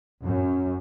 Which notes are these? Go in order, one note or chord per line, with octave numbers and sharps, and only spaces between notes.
F#2